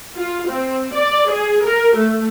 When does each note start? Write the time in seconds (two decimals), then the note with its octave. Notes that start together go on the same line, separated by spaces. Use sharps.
0.17 F4
0.49 C4
0.92 D5
1.29 G#4
1.65 A#4
1.96 A3